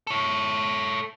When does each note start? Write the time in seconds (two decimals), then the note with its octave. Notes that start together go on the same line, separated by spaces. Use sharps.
0.07 A4 C#5